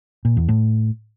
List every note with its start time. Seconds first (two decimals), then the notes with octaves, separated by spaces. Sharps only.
0.25 A#2
0.37 E2
0.48 A2